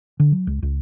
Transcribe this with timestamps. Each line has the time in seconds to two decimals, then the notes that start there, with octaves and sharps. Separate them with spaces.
0.20 D3
0.32 F#3
0.47 C#2
0.62 C#2